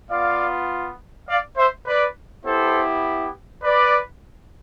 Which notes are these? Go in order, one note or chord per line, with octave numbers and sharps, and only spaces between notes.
B3 F4 D5 F5
D5 F5
C5 E5
B4 D5
B3 E4 G4 A4 C5
B4 D5